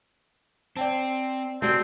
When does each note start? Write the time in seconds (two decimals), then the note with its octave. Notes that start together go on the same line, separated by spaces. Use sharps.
0.76 C4 D5 G5 A5
1.62 G3 G#3 C4 F#4 A5